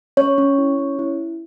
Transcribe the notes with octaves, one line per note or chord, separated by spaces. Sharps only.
C#4 C#5
C#4
E4
C#4
E4